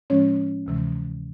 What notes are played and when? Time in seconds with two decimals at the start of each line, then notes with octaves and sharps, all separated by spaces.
0.10 A2 F3 G#3 C#4 C#5
0.66 D2 C3 E3 G#3